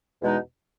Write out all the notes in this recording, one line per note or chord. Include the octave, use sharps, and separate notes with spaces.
E2 B2 G#3 D#4